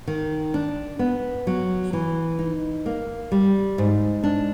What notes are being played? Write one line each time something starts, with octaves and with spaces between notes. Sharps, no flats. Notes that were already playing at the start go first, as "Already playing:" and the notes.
D#3
D4
B3
F#3
E3
D#4
A#3
G3
G#2
D4